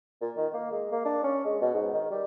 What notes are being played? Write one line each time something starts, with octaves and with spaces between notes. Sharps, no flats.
A#2
D#3
A#3
G#3
A#3
D4
C#4
G#3
B2
G#2
D#3
G3